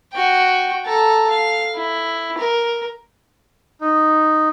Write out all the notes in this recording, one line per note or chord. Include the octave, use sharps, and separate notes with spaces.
F#4 G5
A4 A#5
F5
E4
A#4
D#4